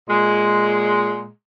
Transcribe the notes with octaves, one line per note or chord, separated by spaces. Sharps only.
A#2 G#3